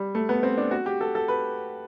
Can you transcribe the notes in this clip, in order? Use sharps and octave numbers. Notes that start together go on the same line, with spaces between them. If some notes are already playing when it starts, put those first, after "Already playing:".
Already playing: G3
A3
B3
C4
D4
F#4
G4
A4
A4
B4